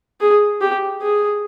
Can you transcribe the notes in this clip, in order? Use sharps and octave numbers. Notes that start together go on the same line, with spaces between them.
G#4
G4
G#4